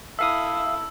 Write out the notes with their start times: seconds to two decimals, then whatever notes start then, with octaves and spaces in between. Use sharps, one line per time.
0.19 E4 A4 E5 F5 D#6 E6